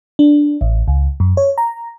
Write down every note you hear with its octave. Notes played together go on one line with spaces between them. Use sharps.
D4
A1
C#2
F#2
C#5
A#5